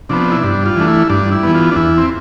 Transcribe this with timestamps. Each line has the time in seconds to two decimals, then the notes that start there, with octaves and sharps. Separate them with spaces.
0.09 C3 F3 B3 D4
0.32 E4
0.43 G2 D4
0.66 F4
0.76 E3 A3 D4
0.88 E4
1.10 G2 D4
1.32 E4
1.43 E3 B3
1.55 F4
1.71 D4
1.76 E2 E4
1.98 C4